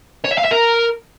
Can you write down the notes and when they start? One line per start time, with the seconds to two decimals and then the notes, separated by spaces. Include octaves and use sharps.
0.24 C#5
0.31 E5
0.38 F5
0.44 E5
0.51 A#4